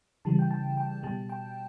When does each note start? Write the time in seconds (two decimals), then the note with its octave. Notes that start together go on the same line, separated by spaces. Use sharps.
0.25 C#3 E3 G3 A5
0.39 G5
0.51 A5
0.77 G5
1.03 B2 G3 A5
1.29 G5